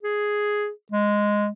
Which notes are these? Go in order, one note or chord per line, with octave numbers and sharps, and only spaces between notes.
G#4
G#3